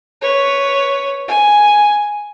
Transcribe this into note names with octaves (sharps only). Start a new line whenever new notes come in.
B4 C#5
G#5